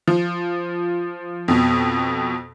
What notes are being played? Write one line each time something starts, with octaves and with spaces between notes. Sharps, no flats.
F3
F2 B2